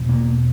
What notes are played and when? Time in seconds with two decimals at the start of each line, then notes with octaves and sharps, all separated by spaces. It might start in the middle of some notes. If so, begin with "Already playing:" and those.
Already playing: E2 B2
0.09 A#3